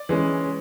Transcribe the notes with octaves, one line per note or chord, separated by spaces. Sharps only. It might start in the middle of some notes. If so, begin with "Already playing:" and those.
Already playing: D5
E3 G#3 C#4